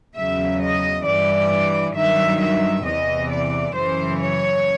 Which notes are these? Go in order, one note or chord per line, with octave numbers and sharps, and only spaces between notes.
E2 C#3 F#3 E5
D#5
G2 E3 D5
G2 D#3 F#3 E5
E5
E2 C3 E3 D#5
D5
F#2 C#3 E3 C5
C#5